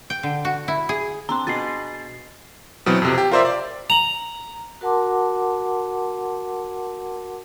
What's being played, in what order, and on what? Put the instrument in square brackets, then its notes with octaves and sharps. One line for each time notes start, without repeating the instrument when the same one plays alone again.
[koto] G5
D3
F#4
E4
G#4
[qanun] C4 D4 [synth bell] A#5 C6
[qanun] B2 B3 G#4 [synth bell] A6 C7
[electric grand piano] B2 E3 F#3 B3 C4
F2 C3
G4
F4 A#4 C5 D5 E5
D5
[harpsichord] A#5 [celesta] F7 F#7
[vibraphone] F#4 A#4 F#5 A5 C6 D6